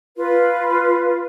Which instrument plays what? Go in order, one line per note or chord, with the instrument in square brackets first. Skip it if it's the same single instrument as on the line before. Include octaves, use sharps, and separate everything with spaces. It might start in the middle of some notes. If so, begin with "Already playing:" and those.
[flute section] F4 B4